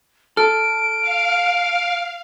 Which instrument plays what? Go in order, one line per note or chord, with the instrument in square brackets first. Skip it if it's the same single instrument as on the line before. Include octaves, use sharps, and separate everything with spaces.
[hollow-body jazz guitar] A4 [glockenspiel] F6 [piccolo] D7
[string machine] F5